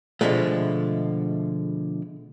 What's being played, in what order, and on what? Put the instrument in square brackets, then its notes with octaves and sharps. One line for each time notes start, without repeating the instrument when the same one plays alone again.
[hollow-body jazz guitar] B2 D3 F3 G#3 A3